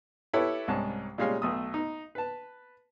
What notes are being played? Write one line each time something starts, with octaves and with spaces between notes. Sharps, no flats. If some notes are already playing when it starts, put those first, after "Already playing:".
E4 G4 A4 B4 C#5
C2 G#2 C#4 A5
A#2 G3 G#3 C#4 F5
B1 A3 D#6
D#4
B4 A5